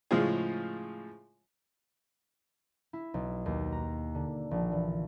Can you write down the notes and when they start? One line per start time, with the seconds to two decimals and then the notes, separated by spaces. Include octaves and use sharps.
0.11 A2 C#3 F3 G#3 F4 G#4
2.93 E4
3.14 B1
3.46 D#2
3.72 A#5
4.15 D3
4.51 A#1
4.72 E3